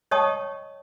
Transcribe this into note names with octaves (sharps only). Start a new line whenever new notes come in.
C#5 D#5 G5 A5 C#6 D#6